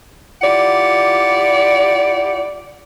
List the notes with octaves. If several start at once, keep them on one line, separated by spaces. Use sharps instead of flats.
E4 F4 G4 D5 F#5